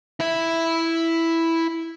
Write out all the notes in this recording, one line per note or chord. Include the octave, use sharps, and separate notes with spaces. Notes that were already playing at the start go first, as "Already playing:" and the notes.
E4 E5